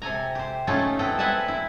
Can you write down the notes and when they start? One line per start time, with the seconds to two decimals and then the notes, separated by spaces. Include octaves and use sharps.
0.02 C3 A4 G#5 A#5
0.35 G4 C5
0.67 A3 C#4 D#4 F4 A4
0.99 B3 C4 E4 A4 D#5 G5
1.19 C4 B4 E5 F#5 G#5 A5
1.48 E4